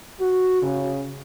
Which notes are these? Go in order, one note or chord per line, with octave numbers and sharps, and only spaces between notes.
F#4
C#3